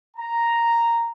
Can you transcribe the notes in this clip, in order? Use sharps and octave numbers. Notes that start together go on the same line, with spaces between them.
A#5